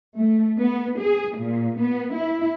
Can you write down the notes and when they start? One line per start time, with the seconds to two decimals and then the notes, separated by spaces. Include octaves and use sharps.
0.19 A3
0.60 B3
1.00 G#4
1.37 A#2
1.82 B3
2.15 E4